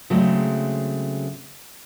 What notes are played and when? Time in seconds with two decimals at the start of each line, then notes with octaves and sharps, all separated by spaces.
0.10 C#3 F#3 G#3 A3 C4